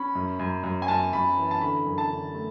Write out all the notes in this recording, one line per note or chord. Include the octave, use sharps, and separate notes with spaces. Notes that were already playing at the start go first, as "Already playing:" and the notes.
Already playing: C#4 B5
F#2
F#2
F#2
G#5
F#2 A5
F#2 B5
E3
A5
D3 B5
F#2
A5
D3
A3